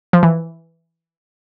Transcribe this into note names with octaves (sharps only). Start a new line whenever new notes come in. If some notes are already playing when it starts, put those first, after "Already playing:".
F3
E3